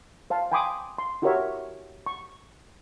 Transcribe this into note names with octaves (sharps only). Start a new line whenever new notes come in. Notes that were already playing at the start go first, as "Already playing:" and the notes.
C5 F5 A5
G5 G#5 B5 C6 D6 D#6
C6
E4 F#4 G4 A#4 C#5 E5
C#6